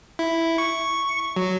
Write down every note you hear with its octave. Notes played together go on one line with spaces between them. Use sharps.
E4
C#6
F#3